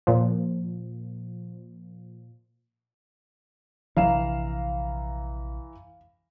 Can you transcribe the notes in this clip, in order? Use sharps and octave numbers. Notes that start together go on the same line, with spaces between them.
A#2 F3
A#1 C3 E3 D4 F5 A#5 E7